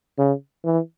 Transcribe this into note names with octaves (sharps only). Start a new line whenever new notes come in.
C#3
E3